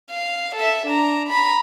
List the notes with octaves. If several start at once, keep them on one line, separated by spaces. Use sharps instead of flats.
F5
A4 E5
D4 A#5
A#5 B5